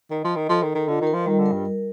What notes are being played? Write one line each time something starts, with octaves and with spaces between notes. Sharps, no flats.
D#3 D#5
F3
D#5
D#3
F3 A4
D#3
D#5
D#3
D3 F4
D#3
A#4
F3
D#3 G3
D3
A#4
G2
A#4